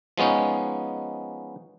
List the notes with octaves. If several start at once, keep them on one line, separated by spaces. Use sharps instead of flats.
F3 G#3 B3 C#4 D#4